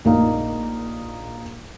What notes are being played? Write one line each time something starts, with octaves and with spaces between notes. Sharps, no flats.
A#1 A#3 D#4 F5